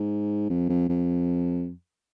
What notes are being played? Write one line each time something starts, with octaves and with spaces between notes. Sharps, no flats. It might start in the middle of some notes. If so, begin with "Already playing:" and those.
Already playing: G#2
F2
F2
F2